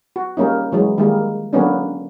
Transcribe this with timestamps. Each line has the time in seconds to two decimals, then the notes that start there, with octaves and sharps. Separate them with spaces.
0.16 F#4
0.37 G3 A#3 C#4 D#4
0.72 E3 F#3 G#3
0.98 D#3 G3 G#3 A#3
1.53 D3 F#3 A#3 B3 C#4 D4